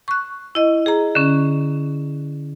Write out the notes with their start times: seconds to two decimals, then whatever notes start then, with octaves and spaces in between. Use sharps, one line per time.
0.08 C#6 F#6
0.55 E4 D#5
0.86 G#4 A#5
1.15 D3 C#4